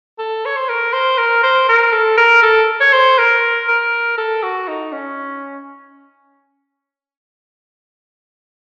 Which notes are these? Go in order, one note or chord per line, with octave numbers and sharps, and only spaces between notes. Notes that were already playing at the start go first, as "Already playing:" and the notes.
A4
C#5
C5
A#4
C5
A#4
C5
A#4
A4
A#4
A4
C#5
C5
A#4
A#4
A4
F#4
D#4
C#4